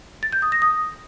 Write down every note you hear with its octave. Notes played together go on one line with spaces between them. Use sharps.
A6
G6
D#6
A#6
D#6